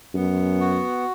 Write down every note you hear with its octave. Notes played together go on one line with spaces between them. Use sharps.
F#2 B3
F#4